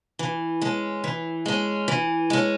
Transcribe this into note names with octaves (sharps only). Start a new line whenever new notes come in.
E3
G#3 C#4
E3
G#3 C#4
E3
G#3 C#4